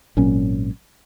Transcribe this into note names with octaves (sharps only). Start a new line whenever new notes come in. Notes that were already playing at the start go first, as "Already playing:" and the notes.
G#1 A#2 F#3 C#4